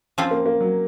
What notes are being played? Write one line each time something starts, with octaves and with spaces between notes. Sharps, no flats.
F3 C4 C#4 F4
A#3
A#3
F#3